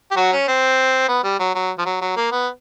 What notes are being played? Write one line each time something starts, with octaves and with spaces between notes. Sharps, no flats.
G4
F#3 F#4
C#4
C4
B3
G3
F#3
F#3
F3
F#3
F#3
A#3
B3